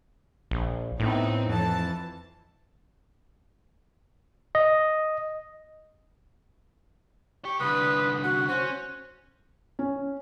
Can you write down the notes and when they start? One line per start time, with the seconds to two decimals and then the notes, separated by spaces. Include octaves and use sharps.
0.51 A#1
1.00 A2 B3 C4 D#4
1.47 F2 E3 A5
4.55 D#5
7.45 G4 C#6
7.60 C2 D3 B4 D#6
8.24 F#4 F#5
8.49 C#4 F#4 C5
9.79 C#4